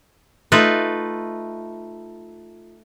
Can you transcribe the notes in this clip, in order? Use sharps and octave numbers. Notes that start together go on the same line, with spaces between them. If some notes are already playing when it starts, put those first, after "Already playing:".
A3 D#4 F4 B4